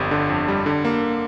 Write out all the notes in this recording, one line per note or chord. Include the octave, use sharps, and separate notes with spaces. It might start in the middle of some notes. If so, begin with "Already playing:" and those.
Already playing: G1 F2 G3
D3
F2
G3
D3
A#3